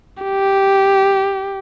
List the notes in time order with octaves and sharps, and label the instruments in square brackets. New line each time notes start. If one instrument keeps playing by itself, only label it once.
[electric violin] G4